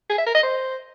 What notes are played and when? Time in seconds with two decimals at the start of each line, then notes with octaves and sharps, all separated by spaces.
0.10 G#4
0.18 E5
0.26 A#4
0.35 D#5
0.43 C5